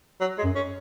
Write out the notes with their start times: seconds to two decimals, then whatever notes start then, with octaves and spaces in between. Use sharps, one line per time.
0.21 F#3
0.38 G#3
0.43 F#2
0.55 C#4